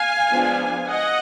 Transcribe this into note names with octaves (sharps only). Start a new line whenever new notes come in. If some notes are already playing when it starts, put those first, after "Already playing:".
Already playing: F5 G#5
F3 G#3 B3 D4
D#5 F#5